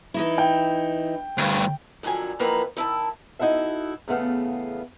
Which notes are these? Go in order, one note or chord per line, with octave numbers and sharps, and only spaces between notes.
E3 D#4 E4
G5
D2 G2
F2 A#2 D3 F#3 G#5
F2 E3 A#3 A#4 B4 F#5
D#3 E4 G5 A5
D#4 E4 F#4 A4 E5
E2 C#3 A3 B3 F5